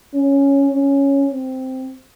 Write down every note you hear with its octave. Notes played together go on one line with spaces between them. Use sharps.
C#4
C#4
C4